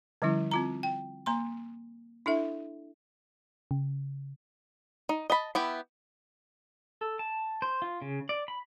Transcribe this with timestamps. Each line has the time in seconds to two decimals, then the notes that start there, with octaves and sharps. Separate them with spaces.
0.22 D3 F3 G3 C#4 E4
0.51 C4 F4 A#5
0.83 G5
1.26 A#3 A#5 C6
2.26 D4 E4 A4 E5
3.71 C#3
5.09 D#4
5.30 D#5 A5 B5
5.55 B3 E4 G4
7.01 A4
7.19 A5
7.62 C5
7.82 F4
8.02 C#3
8.29 D5
8.48 B5